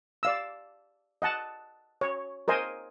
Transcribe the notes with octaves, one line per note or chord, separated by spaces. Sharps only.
D5 F5 E6
D#5 F#5 A5
C#5
A#4 C5 D#5 G#5